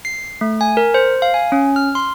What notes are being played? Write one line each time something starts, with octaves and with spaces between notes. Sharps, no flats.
C7
A3
G#5
A#4
C5
F5
G#5
C#4
F6
C6